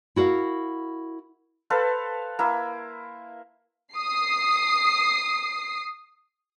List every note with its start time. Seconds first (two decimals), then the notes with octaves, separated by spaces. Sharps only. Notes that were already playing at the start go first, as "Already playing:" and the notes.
0.16 E4 F#4 A#4 F5
1.70 A4 B4 C5 F5
2.39 A#3 E4
3.93 D#6 C7